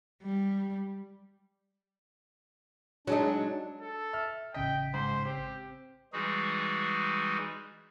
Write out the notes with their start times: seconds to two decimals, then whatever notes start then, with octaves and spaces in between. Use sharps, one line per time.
0.23 G3
3.07 F#3 G#3 D4 D#4
3.81 A4
4.13 E5 F6
4.54 A1 C#3 D#5 G5 B6
4.94 G#2 C5
5.25 C4 G4
6.13 E3 G3 G#3 D#4 F#4 G#4